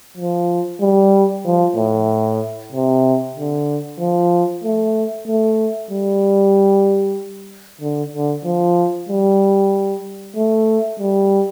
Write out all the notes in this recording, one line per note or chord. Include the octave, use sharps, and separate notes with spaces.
F3
G3
F3
A2
C3
D3
F3
A3
A3
G3
D3
D3
F3
G3
A3
G3